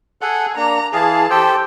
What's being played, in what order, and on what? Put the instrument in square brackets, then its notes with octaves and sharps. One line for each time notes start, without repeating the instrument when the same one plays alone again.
[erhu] G#4 [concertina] A4 F#5
[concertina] A#3 D4 [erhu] A#5
[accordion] E3 G#4 [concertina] F5 [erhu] A5
[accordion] G4 [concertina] A4 C5 G5